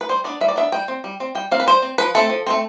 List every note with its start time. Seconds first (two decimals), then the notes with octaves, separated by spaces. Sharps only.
0.01 B4
0.09 G3 C5
0.24 B3 D4 D5
0.41 G3 E5
0.48 D5
0.56 B3 D4 E5
0.72 G3 G5
0.88 C4
1.04 G3
1.20 C4
1.35 G3 G5
1.51 C4 F5
1.60 B4
1.67 G3 C5
1.82 C4
1.98 F3 B4
2.15 A3 C4 A4
2.30 F3
2.47 A3 C4